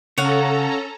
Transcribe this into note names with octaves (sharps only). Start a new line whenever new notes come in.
C#3 C#4 A4 C#5 F5 F#5 A#5